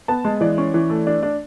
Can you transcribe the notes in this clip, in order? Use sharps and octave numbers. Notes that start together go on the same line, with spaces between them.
B3 A5
G#3
E3 D5
C#4
E3
A3
D4
D4